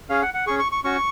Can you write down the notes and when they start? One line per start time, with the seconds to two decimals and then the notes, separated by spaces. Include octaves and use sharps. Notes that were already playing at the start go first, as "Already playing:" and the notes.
0.09 C#4 G#4 F5
0.22 F#5
0.34 F#5
0.47 C#4 G#4 C#6
0.59 C#6
0.72 C#6
0.84 C#4 F#4 C#6